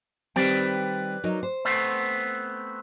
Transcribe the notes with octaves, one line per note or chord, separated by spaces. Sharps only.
D#3 G3 C4 B4 D5 G5
F#3 D#4 A#4
C5
A3 B3 C4